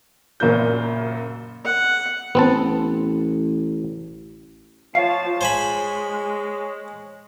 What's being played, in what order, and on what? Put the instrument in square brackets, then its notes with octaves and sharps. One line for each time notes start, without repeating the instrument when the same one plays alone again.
[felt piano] F#1 F#2 A#2 A#3 G6
[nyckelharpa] F#5
[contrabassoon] A1 [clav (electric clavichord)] B3 C4 A5
[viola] F3 A5 [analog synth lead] C#5 [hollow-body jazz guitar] F5
[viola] G#3 [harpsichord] C5 G#5 B5